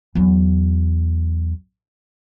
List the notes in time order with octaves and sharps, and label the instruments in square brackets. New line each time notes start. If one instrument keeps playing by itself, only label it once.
[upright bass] E2 F#3